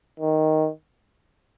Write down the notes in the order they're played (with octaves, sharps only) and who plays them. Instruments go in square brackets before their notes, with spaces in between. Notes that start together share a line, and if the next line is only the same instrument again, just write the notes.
[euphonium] D#3